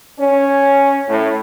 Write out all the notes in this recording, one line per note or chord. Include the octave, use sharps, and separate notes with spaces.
C#4
A2